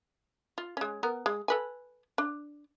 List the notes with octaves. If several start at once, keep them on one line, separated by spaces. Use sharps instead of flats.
F4
G#3 C#4
B3 A#4
G#3
A4 B4 G#5
D4